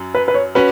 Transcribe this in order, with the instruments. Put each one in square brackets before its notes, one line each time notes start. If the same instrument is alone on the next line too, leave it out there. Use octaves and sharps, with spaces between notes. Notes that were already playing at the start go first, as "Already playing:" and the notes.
Already playing: [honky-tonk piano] F#2 F#3
[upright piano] B4
B4
C#5
[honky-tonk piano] C#4 F#4 [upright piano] B4